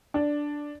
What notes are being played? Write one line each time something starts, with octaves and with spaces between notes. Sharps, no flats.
D4